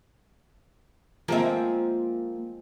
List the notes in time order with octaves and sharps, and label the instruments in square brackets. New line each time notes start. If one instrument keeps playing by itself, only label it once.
[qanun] F3 G#3 C4 [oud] A#3 E5